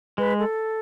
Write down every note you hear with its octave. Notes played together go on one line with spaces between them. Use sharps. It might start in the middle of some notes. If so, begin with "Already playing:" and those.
G#3 B4
A4